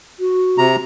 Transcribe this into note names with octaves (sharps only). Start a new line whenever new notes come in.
F#4
C3 A#5